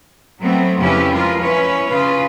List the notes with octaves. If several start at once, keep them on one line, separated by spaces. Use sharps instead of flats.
F#3 A3 B3 C4
F2 C#3 C#4 E4 G4 B4
F3 G#3 F4 A#4 B4
C#4 E4 B4 C#5
C#3 F4 B4